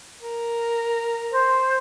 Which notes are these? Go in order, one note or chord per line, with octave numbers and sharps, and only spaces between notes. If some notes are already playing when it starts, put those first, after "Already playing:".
A#4
C5